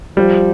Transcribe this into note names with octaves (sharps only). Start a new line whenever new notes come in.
F3 G3